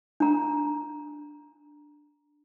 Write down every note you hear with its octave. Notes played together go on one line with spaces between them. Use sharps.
D4 A#5